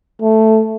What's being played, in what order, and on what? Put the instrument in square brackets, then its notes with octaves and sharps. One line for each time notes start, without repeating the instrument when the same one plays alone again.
[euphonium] A3